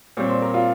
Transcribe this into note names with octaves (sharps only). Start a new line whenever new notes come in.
A#2 G3 C4 C#5
C5
A#4
F4